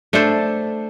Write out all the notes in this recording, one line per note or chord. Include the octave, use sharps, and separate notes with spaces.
A3 D4 A4 C5